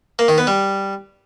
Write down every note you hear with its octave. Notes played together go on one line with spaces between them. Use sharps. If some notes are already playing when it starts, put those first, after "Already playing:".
A#3
D#3
B3
G3